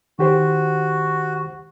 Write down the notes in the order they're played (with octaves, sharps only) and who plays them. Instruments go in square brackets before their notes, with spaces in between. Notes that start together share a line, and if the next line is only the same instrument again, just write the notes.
[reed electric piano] D#3 G4 C5 [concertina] F#4